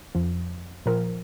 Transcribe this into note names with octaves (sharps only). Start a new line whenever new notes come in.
F2 F3
A#2 F3 A#4